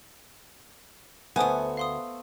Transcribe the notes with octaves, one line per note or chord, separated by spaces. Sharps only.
D2 A3 B3 B4 C5 G#5 D#6
F5 C6 D#6